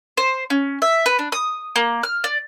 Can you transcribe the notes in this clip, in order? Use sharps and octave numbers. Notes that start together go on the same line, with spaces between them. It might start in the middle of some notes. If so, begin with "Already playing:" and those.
C5
C#4
E5
B4
D4
D#6
A#3
F6
D5